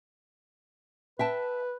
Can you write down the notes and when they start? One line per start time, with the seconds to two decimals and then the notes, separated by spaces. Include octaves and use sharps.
1.19 B4 E5 G5 A5